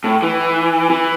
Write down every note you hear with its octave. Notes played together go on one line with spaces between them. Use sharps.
A2
E3
E3